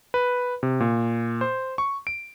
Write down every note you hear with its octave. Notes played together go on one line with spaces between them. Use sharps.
B4
C3
A#2
C5
C#6
D7